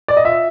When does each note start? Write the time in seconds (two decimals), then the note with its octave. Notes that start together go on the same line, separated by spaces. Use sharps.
0.08 D5
0.17 D#5
0.25 F4 E5